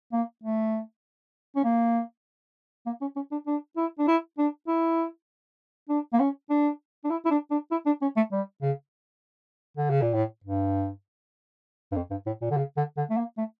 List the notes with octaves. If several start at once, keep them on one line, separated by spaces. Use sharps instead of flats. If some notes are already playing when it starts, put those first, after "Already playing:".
A#3
A3
C#4
A#3
A#3
C#4
C#4
D4
D4
E4
D4
E4
D4
E4
D4
A#3
C#4
D4
D4
E4
E4
D4
D4
E4
D4
C#4
A3
G3
C#3
D3
C#3
A#2
A2
G2
G2
F2
G2
A2
A#2
D3
C#3
D3
D3
A3
A#3
A3